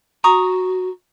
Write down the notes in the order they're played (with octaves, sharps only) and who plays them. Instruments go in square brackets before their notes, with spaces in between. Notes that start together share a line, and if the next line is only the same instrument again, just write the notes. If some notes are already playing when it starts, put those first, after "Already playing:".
[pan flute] F#4 [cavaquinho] A#5 C#6 D#6